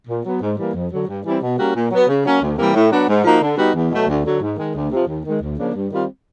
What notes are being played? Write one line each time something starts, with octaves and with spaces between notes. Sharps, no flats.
A#2
F#3 B3
G#2
E3 G3 A#3
F2
D3 F#3
G2
E3 G3 C4 E4
B2
G3 A#3 C#4 F#4
A#2
F#3 B3
C#3
F#3 A#3 C#4
D2
C3 E3 G3 A#3
A2
F#3 B3 D4 F#4
G#2
F3 A#3 D#4 F#4
D3
G3 B3 D#4 F#4
E2
B2 F#3 A3
D2
D3 F#3
G#2
D#3 G#3
D2
C3 F3
D#2
D#3 G#3
D2
C#3 F3 A#3 D4
G2
D#3 G3 C4 F4